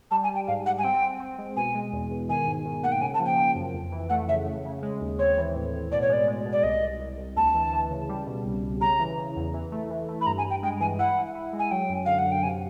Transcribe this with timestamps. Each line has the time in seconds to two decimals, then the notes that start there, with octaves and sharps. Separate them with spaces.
0.11 G3 A5
0.24 G#5
0.30 G3
0.35 G5
0.48 G#2 F5
0.66 G3 F#5
0.78 G#5
0.84 C4 G5
1.02 C4
1.20 C4
1.38 G#3
1.57 B2 G#5
1.75 G#3
1.92 E2
2.11 B2
2.29 D#3 G#5
2.47 G#2
2.65 D#3
2.83 A#3 F#5
2.92 G5
3.01 C#3 G#5
3.14 A5
3.19 F3
3.26 G5
3.37 F3
3.55 F#2
3.74 F2
3.92 E3
4.10 A3 F#5
4.28 C#3 E5
4.46 C#3
4.65 C#3
4.82 G#3
5.01 D#2
5.19 C4 C#5
5.38 E3
5.55 A2
5.73 A2
5.91 B2 D5
6.02 C#5
6.09 G#3 D5
6.28 G#3
6.46 B2
6.52 D5
6.63 C2 D#5
6.82 C2
7.00 C2
7.18 C2
7.36 D2 A5
7.54 E3
7.73 E3
7.91 C#3
8.09 G3
8.27 B2
8.45 C2
8.63 C2
8.81 C#3 A#5
8.99 E3
9.18 C#3
9.36 E2
9.54 E3
9.72 A3
9.90 E3
10.09 A3
10.21 B5
10.27 G2 A#5
10.38 G#5
10.45 G2
10.50 G5
10.63 G#3 G5
10.80 E3 G#5
10.99 E4 F#5
11.16 E4
11.35 E4
11.53 G#3
11.59 G#5
11.71 F#3 G5
11.89 F#2
12.06 D3 F5
12.19 F#5
12.26 F#2
12.32 G5
12.43 C3 G#5